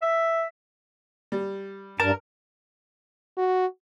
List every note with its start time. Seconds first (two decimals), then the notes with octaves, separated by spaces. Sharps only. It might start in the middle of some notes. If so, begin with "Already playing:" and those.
0.02 E5
1.32 G3
2.00 G2 A#4 A5
3.37 F#4